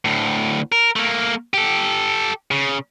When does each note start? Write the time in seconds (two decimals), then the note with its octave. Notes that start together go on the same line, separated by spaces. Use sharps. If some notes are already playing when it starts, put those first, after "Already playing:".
0.05 D2 A2
0.72 A#4
0.96 A3 A#3
1.54 G4 A4
2.51 C#3